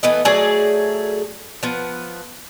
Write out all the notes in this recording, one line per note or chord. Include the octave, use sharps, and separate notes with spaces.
E3 A3 B3 D#5
F#3 A3 G#4 D5
F3 B3